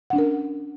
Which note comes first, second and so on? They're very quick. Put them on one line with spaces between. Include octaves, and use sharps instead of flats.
F#5 D4 C#4 A#4